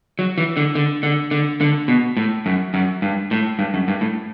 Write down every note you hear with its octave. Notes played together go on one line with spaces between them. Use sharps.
F#3
E3
D3
D3
D3
D3
D3
B2
A2
F#2
F#2
G2
A2
G2
F#2
G2
A2